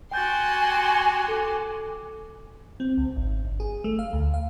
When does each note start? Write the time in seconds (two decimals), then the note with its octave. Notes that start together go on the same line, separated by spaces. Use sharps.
0.11 F#4 G4 G5 G#5 C6 G6 A6
1.28 A4 D6
2.80 C4
2.97 C#2
3.16 G#1
3.45 G1
3.60 G#4
3.84 A3
3.99 F5
4.13 D2
4.34 F5